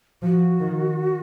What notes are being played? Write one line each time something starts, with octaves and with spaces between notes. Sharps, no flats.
F3 F#4
D#3